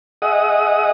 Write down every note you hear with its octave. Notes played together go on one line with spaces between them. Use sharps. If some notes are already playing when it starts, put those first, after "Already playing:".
G#4 D#5 E5 F#5 D#6